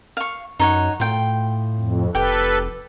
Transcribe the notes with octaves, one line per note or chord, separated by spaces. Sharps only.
F5 C#6
F#2 D#4 C#5 F#5
A2 F4 G5
F2
F1 G4 A4 B4 G5